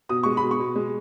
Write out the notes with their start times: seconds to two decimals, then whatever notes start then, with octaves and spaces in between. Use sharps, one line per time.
0.09 B2 D#6
0.23 G#3 C#6
0.37 B5
0.42 B2
0.51 C#6
0.60 B2
0.75 G#3